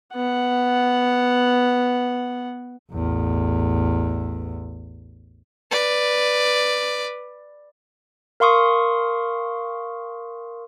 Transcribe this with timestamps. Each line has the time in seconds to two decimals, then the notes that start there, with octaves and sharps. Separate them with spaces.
0.16 B3 F#5
2.93 A1 E2
5.71 B4 D5
8.40 A#4 F5 C6 C#6 D#6